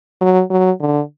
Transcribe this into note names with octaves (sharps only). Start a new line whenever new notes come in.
F#3
F#3
D3